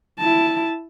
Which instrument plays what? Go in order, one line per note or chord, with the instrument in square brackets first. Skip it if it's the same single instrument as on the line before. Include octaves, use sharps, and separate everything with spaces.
[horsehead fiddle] E4 A5